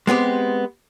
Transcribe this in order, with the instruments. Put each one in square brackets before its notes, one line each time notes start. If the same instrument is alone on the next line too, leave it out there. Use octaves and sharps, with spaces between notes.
[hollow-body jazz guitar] G#3 B3 C4 G4